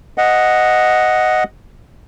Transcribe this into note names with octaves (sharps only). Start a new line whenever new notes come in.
D#5 F#5